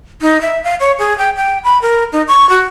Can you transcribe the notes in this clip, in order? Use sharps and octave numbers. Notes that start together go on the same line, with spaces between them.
D#4
E5
F5
C#5
G#4
G5
G5
B5
A#4
D#4
C#6
F#4